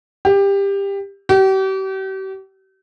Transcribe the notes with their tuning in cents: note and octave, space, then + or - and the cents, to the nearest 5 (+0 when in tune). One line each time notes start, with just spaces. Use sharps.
G4 +20
G4 -40